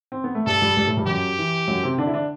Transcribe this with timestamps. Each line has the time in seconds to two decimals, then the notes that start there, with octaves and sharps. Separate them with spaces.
0.12 C4
0.24 B3
0.35 A3
0.47 G2 G3 A4
0.61 G2 G3
0.77 G2 G3
0.87 A2 A3
0.97 G2 G3
1.07 F#2 F#3 G4
1.38 E3
1.68 F#2 F#3
1.83 C3 C4
1.98 D3 D4
2.07 E4
2.13 D3 D4